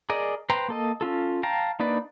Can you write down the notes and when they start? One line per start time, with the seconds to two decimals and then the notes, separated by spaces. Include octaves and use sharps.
0.10 G#4 A#4 D5 D#5
0.50 B4 C5 G5 A#5 C6
0.69 A#3 A4 D#5
1.01 C#4 F4 A4
1.43 F5 G5 A5 A#5
1.80 A#3 D4 D#4 B4 D5